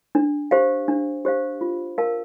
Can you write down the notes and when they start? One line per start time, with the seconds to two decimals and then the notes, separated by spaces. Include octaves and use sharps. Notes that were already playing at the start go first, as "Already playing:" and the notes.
0.15 D4
0.51 G4 C5 F5
0.88 D4
1.25 G4 C5 F5
1.61 F4
1.98 A#4 F5 A5